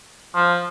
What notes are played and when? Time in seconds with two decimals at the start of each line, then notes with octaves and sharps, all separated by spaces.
0.35 F3